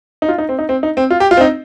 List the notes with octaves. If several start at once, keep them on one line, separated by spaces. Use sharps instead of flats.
D#4
F4
D#4
C4
D#4
C4
D#4
C4
F4
G4
F4
C4
D#4